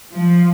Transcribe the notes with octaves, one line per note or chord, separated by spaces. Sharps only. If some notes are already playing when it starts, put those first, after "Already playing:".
F3